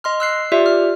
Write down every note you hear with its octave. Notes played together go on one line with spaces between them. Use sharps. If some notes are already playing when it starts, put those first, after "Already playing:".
D#5 C6 F6
E6 F#6 C7
F4 G4 D5 E5
F6